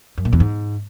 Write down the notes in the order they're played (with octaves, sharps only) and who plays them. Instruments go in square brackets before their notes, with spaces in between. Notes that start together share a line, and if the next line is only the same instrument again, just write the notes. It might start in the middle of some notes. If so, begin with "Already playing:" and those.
[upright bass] F#2
A#2
E2
G#2